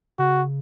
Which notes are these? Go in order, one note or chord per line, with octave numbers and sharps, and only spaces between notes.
C#3 F#4